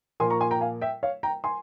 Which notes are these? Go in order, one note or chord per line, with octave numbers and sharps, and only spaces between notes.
A#2 F3 A#3 G#5 C6
A#5 C#6
G#5 C6
G5 A#5
F5 G#5
E5 G5
C#5 F5
G5 A#5
G#5 C6